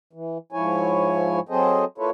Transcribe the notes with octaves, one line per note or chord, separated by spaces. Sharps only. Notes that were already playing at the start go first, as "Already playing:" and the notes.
E3
G#2 F3 E4 C#5 G#5
F#3 C4 G#4 A4 C5 D#5
A#3 E4 F4 A4 B4 C#5